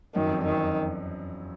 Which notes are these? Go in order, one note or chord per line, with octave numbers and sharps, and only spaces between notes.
F#2 D#3
F2
E2
D#3
F2